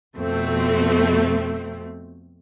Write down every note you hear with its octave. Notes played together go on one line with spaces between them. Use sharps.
F2 B2 A3 C4